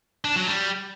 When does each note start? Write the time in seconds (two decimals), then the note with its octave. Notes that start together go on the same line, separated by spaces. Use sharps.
0.25 D4
0.36 F#3
0.48 G3